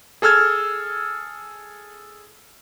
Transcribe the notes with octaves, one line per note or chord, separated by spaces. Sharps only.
G#4 A4 E6 F6 G#6